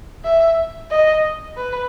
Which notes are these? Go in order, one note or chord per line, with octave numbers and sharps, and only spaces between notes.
E5
D#5
B4